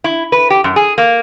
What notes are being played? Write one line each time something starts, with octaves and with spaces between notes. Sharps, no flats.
E4
B4
G4
F#2
G#4
A#3